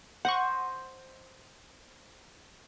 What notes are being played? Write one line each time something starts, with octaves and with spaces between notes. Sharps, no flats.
C5 D#5 F#5 C#6